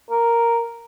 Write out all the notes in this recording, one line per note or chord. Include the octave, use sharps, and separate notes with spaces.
A#4